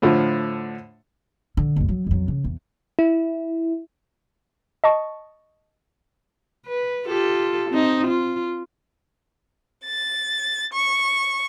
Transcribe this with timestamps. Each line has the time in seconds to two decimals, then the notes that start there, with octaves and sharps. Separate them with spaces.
0.02 A2 D3 F3 F4
1.57 D3
1.76 F#1 D2
1.89 F#3
2.06 F2 F#3
2.28 C#3
2.44 E2
2.99 E4
4.84 D#5 A5 C#6
6.66 B4
7.06 F4 G4 A4
7.70 C4 D#4
8.07 F4
9.85 A6
10.72 C#6